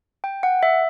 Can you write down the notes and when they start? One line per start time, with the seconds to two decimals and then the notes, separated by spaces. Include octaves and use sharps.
0.24 G5
0.43 F#5
0.63 E5